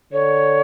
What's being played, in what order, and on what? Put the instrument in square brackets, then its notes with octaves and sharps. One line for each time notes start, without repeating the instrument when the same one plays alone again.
[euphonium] D3 [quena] C#5